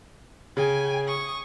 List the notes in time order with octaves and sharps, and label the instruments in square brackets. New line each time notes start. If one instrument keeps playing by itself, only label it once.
[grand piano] C#3 [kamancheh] G5 G#5
[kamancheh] C#6 D#6